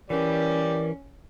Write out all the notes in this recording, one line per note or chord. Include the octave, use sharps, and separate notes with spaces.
E3 C#4 G4 A#4 D5